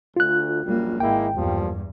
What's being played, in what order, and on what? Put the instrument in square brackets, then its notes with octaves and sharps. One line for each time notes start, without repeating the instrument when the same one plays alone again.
[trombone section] D2 [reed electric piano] F4 F#6
[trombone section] A#1 F#2 [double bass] G3 A#3
[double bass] G#1 [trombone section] G#3 A#3 E4 [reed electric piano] G5
[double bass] E2 G2 [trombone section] A#2 F3 G3